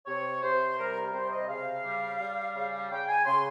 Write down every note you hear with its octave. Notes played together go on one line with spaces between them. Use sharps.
C3 C#5
C3 C5
G3 A#4
C3 C5
D#5
C#3 F5
G3
G3
C#3
C#3 G5
G#5
C#3 C6